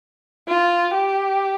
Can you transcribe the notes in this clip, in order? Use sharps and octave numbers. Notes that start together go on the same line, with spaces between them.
F4
G4